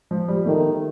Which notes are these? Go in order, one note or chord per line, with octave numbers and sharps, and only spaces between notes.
F3
G3
D#3 A3